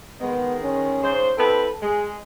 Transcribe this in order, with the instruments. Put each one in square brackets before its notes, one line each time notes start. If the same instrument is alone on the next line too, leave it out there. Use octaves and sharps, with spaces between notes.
[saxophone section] D#3 G#3 [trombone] B3
[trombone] C#4
[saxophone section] G#2 C#3 C5
[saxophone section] C4 E4 B4 [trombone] A4
[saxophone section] G#3 [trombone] G#4